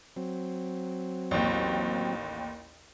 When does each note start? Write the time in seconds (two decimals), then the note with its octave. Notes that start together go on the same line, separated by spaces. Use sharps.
0.16 F#3 C4
1.31 A1 D#2